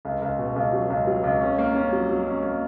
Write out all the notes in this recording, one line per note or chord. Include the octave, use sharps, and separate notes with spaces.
C#2
C#2
B2
C#2
F#3
C#2
F#3
C#2
C#4
A#3
C#4
F#3
F#3
C#4
A#3